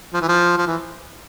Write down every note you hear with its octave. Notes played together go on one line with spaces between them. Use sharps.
F3
E3
F3
F3
E3